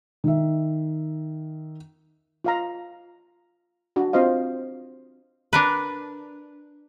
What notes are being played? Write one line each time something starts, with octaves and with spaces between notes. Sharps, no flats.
D#3 E5
F4 F5 A#5
D4 F#4
C4 F4 C5 D#5 F5
D4 A#4 B4